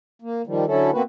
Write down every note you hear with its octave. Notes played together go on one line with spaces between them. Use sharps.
A#3
D#3 F3 G3
D3 F#3 C#4 E4 A4
B2 A#3 C4 F#4 B4